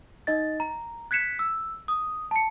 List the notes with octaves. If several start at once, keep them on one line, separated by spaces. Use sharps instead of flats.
D#4 D#5 A6
A#5
F#6 G#6 B6 C#7 E7
E6
D#6
A5 C#7